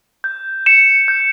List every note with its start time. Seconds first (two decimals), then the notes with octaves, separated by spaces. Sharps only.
0.24 G6
0.66 C#7 E7
1.08 G6